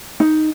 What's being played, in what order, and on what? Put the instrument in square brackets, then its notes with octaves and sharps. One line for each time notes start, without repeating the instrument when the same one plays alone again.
[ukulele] D#4